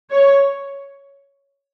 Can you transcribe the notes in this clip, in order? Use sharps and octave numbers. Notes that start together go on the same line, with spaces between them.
C#5